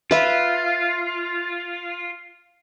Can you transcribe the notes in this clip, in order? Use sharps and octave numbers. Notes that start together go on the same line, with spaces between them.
F4 B4 E5